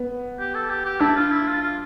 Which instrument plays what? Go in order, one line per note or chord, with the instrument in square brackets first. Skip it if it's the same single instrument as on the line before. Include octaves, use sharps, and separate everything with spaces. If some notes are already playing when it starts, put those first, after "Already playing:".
Already playing: [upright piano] B3
[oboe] G4
A4
G4
G4
[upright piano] D4 [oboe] E4
[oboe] F4
E4
F4
F4